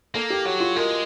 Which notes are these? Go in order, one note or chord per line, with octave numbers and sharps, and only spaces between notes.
A#3 A4
G4
F#3 F#4
F4
G#3 A#4